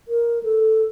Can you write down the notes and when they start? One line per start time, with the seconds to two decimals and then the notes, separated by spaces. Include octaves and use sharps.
0.08 A#4
0.43 A4